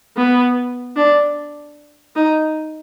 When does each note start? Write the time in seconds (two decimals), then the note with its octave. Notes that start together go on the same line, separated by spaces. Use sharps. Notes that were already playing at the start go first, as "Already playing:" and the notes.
0.17 B3
0.96 D4
2.16 D#4